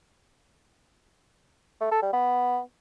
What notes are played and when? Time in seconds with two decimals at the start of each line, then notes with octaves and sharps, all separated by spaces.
1.81 A3
1.92 A4
2.02 G3
2.13 B3